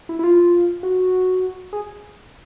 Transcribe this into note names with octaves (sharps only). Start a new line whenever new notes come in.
E4
E4
F4
F#4
G#4